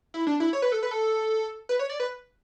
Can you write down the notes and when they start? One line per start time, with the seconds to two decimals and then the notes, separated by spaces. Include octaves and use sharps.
0.14 E4
0.27 D4
0.40 E4
0.53 C#5
0.62 B4
0.72 A4
0.83 B4
0.91 A4
1.69 B4
1.79 C#5
1.90 D5
2.00 B4